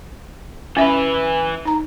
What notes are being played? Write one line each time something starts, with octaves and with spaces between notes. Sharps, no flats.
E3 C#4 B4 E5
D#4 A#5